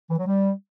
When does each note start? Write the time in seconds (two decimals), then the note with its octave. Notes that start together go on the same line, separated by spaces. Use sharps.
0.10 E3
0.18 F#3
0.27 G3